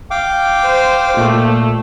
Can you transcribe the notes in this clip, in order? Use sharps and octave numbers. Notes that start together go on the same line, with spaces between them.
F5 G5 D6
C5
A#2 A3